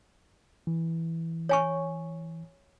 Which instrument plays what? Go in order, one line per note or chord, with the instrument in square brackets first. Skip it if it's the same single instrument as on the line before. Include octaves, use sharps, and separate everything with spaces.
[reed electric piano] E3
[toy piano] C#5 G#5 C#6